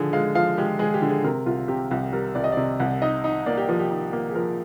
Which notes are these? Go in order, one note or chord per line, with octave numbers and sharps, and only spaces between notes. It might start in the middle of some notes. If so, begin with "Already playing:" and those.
Already playing: D3 F3 G#4
G#3 F5
F3 F5
G#3 G4
G#3 G#4
G4
D3
G#4
C3 A#4
C2 F4
C3 G4
C2 G4
G3 A#4
C2 D5
D#5
C3 D5
C2
D#4 D#5
D#4
A#3 D5
G4
F3 G4
G4
D#4
A#3
G#4
F3 A#4